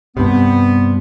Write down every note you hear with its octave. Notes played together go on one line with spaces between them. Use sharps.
G2 C3 B3